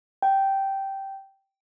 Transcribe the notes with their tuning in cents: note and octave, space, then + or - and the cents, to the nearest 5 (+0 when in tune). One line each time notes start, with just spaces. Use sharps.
G5 -10